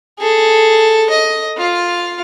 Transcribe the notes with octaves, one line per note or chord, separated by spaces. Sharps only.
G#4 A4
D#5
F4 F5